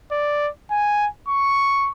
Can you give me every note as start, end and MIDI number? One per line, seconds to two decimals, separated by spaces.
0.12 0.49 74
0.71 1.07 80
1.29 1.91 85